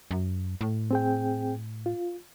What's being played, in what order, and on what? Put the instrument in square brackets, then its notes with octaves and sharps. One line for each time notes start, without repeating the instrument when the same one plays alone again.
[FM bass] F#2
A2
[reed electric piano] C4 G#4 G5
F4